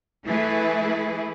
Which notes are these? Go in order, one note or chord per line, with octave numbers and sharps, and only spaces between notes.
E3 A3 E4 G#4 B4